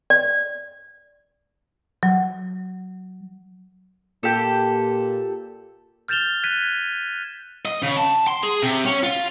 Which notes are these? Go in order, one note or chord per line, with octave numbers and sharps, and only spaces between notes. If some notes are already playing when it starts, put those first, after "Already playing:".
D5
F#3
A#2 G4 A4
F6 G6 A6 E7 F7 G7
F#6 G#6 B6 D#7
D#5
C#3
A5
C6
G#4
C3
C#4
F4